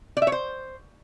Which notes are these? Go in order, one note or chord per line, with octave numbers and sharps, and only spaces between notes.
D5
E5
C#5
C5